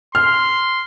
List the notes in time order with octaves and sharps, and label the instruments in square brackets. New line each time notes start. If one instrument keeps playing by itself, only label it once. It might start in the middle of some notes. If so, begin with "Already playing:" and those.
[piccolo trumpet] C6 [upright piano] F6